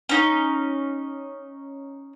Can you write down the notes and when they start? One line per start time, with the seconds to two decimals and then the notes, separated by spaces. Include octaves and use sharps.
0.09 C#4 D#4